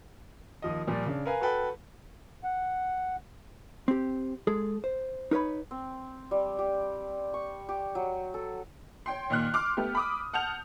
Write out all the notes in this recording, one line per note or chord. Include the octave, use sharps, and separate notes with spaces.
D#2 F3 D#5
A#2 F3 G3
C#3 D4
A#4 B4 F5 G#5
F#4 A4 B4 G5
F#5
C4 G4
G#3 G#4 A4
C5
D#4 A#4 B4 C#5 B5
C4
G3
G4
C#6
G4
F#3
A4
C#5 G5 C6
A#2 D#3 C6 F6 F#6
C6 D6 F6
A3 B3 G4
B5 D6 D#6
F#5 A5 F6 G6 F7